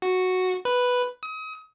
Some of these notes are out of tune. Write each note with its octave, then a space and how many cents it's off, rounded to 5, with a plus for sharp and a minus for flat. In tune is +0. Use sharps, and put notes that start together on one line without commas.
F#4 -5
B4 +0
D#6 +35